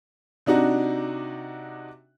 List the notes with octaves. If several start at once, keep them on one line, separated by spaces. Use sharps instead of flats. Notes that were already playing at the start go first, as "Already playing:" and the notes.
C3 D4 D#4 F#4